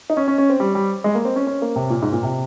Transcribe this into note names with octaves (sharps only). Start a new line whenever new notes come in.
D#4
C#4
C#4
C#4
C4
G3
G3
G#3
A#3
C4
C#4
C#4
A#3
C3
A#2
G#2
A#2
C3